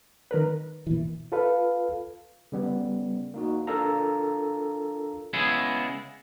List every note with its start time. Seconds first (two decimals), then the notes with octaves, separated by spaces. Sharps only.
0.31 D#3 A#4 B4
0.87 A#2 E3
1.32 F4 A4 B4 F5
2.52 C#3 G3 B3
3.34 A#3 D#4 F#4
3.67 D4 F4 A4 A#4 F5 A#5
5.33 C#3 G#3 B3 E4 G#4